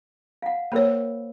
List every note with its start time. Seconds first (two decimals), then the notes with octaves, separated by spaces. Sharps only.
0.42 F5 F#5
0.72 A#3 A#4 C5 C#5 B5